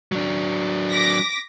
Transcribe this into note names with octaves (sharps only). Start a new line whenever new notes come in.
F#3 D4
D6 A#6 B6